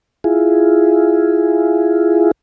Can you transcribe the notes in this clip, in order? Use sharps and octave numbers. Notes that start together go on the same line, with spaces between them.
E4 F4 G#4